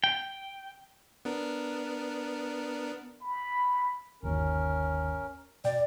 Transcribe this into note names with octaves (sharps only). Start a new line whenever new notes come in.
G5
B3 D4 A#4
B5
G1 D#2 D#3 C#4 A#4
B2 D5 G5